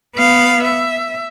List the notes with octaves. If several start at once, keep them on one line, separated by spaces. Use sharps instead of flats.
B3 F5
E5